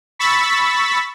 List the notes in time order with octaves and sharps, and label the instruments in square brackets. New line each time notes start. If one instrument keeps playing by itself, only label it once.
[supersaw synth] B5 C#6 E6 A6 B6